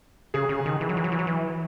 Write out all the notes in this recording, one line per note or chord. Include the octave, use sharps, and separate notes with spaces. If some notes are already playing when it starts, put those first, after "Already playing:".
C#3 G#4
C#3
D#3
E3
F#3
E3
F#3
E3
F#3
E3